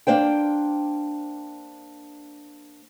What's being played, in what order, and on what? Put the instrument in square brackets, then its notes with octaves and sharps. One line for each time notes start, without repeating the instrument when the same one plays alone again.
[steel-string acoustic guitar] A#3 D4 C5 G5